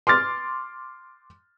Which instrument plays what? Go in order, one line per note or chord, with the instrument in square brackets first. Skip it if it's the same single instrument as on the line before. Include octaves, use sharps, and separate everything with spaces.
[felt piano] C6 D6 F6 A6